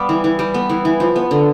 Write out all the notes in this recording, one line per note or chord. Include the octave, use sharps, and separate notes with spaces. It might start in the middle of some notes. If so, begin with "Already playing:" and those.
Already playing: G3 B3 D5 F5
E3
E3
G3
B3
E3
E3
F3
B3
D3